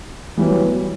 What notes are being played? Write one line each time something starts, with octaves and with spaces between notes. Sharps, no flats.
E3 F#3 G3 B3